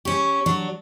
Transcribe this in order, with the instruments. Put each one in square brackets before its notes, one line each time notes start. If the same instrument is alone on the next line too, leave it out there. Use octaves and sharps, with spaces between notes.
[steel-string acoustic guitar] C#4 G4 [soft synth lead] C#6
[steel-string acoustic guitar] F#3 D4